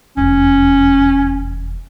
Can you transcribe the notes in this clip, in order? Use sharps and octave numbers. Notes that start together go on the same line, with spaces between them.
F1 E2 C#4